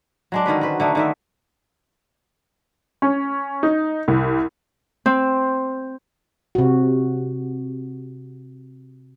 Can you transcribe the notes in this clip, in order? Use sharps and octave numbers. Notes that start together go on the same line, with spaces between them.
F#3 G#3 D4
D3 D#3 C#4 B4
F#4 B4 C5
D3 A3 D#4
D3 D#3 E5
C#4
D#4
C2
C4
C3 F#4